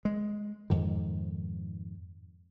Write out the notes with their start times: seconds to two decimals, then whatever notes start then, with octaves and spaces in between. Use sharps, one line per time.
0.05 G#3
0.70 F2 G#2 D#3